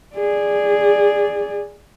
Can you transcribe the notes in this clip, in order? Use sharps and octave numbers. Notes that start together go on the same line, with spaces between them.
G#4 D5